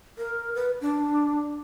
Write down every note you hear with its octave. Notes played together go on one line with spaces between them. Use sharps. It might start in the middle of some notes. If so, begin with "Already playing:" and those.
A#4
B4
D4